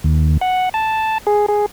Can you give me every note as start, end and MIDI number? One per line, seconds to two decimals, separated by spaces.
0.04 0.38 39
0.41 0.69 78
0.74 1.18 81
1.27 1.46 68
1.48 1.66 68